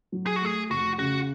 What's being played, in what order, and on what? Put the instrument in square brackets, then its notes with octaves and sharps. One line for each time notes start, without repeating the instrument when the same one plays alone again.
[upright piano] F#3
[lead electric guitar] G#4
F#4
[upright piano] A3 [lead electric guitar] G#4
[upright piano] F1 [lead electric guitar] F#4
[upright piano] C#3 [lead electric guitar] F#4